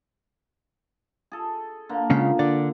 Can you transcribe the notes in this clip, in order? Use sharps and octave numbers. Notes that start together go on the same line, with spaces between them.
G#4 A4
D3 A#3
A#2 C#3 G#3 C#4
D3 D5